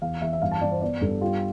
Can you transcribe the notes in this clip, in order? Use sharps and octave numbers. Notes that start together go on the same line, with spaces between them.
E2 F5
E2 E5
E5
G2 F5
A5
G2 D5
C5
B3 D5
G2 A4
G3 F4